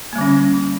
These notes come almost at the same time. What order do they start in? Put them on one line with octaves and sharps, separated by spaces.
A#3 G3 D3 C#4